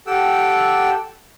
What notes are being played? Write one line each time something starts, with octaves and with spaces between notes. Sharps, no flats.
G4 A4 F#5 G5 E6